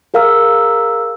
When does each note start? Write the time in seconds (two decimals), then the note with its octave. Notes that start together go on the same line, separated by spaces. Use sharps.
0.14 G#4 A#4 F5 A#5 E6